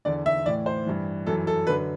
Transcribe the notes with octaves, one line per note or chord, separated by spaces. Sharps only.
E2 D3 D5
E5
A2 E3 D5
C5
G2 E3
F#2 E3 A4
A4
F#2 D3 B4